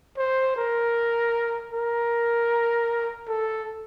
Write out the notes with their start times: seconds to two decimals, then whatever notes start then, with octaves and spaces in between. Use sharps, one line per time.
0.18 C5
0.57 A#4
1.72 A#4
3.28 A4